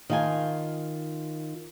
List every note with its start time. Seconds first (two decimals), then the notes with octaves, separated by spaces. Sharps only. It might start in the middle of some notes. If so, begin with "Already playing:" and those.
0.10 D#3 F4 G#5